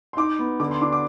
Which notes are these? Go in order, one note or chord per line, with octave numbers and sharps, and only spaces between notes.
C6
D#4 D6
B3
D3 D6
C6
D4 D6
D6